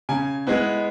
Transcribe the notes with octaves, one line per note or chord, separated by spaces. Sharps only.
C#3 G#5
G#3 B3 E4